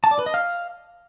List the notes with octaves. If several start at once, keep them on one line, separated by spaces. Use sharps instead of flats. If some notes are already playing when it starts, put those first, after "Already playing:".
A5
D5
B4
D#5
F5